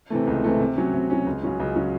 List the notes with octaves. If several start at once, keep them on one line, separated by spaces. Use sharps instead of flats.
C3 E3 A3
C#2
C3 E3 A3
C3
F#3 C#4
C3
F#3 C#4
C#2
C#3 F#3 C#4
C#2
C#3 F#3 C#4